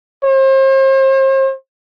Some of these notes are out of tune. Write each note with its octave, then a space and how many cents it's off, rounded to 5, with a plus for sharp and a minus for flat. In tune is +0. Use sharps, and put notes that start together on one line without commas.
C5 +40